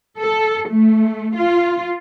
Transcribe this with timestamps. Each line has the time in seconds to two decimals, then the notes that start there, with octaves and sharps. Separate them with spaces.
0.18 A4
0.68 A3
1.36 F4